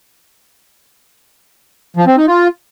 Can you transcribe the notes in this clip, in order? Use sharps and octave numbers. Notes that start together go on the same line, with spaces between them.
F3
C4
D#4
F4